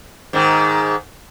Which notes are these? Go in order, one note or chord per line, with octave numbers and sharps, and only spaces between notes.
G#2 D#3